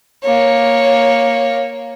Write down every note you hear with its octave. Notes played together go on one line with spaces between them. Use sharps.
A#3 C#5